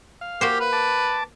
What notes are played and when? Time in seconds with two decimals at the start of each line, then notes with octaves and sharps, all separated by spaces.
0.21 F5
0.41 A#3 F#4 G4 C5
0.60 B4
0.73 A5 D6